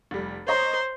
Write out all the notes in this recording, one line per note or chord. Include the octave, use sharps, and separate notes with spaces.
F1 G3
C5 C#5 D#5 A#5